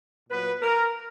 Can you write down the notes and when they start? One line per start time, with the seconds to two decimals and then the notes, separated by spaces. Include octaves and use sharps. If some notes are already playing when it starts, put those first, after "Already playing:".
0.29 A#2 F#3 B3 B4
0.62 A#4